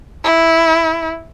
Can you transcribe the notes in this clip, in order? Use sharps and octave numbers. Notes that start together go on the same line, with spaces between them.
E4